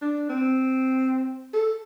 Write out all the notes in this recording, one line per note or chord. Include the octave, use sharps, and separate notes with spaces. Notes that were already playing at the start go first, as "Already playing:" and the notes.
D4
C4
A4